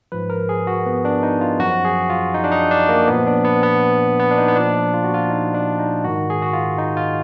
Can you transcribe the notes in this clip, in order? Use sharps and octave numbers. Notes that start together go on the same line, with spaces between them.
G#2 F3 B4
A#4
G#4
F#4
B3
D4
D#4
F4
F#2 F3 F#4
G#4
F4
D#4
D4
D#4
D4
A#3
A#2 F3 B3
D4
B3
B3
B3
D4
D#4
B3
A#2 F3 D4
F4
F#4
F4
D#4
D4
D#4
G#2 D#3 F#4
G#4
F#4
F4
D#4
F4